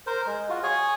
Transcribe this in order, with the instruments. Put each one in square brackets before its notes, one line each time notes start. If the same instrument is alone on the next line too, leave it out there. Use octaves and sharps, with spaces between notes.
[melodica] A#4 C5
G#3
F4 F#4
G#4 C#5 G#5